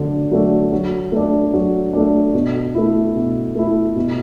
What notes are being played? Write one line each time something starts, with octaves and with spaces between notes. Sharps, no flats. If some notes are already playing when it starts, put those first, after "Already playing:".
Already playing: D3 F#3 A3 D4
F#3 A3 D4
F#3
A3 D4
F#3
A3 D4
B2
A3 E4
B2
A3 E4
B2